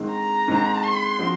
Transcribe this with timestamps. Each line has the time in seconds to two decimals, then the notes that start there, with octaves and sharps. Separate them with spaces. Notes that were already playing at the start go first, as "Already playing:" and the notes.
Already playing: G#2 D#3 G#3 C4
0.12 A#5
0.48 G#2 D#3 G#3 C4
0.83 C6
1.19 F3 C4 D#4 F#4